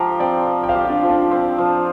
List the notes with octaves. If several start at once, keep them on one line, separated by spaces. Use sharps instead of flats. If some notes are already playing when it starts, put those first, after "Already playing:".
Already playing: F3 G4 F5 G5 A#5
C4 D5 G5
F3
G5
C5 F5
G4
F4
D4
F3
D4
C4
F3